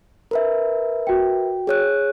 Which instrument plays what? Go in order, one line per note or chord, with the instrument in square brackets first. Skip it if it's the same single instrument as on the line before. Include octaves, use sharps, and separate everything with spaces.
[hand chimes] A#4 B4 E5
[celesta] F#4 G5
[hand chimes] G#4 C#5 F#6